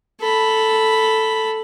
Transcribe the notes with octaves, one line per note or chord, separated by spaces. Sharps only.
A4 B5